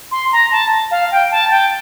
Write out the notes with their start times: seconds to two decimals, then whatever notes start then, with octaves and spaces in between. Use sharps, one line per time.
0.11 C6
0.32 A#5
0.52 A5
0.91 F5
1.12 G5
1.31 A5
1.50 G5